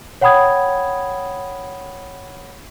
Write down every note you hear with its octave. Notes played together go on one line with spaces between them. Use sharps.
C#5 F#5 G5 B5 D#6 G#6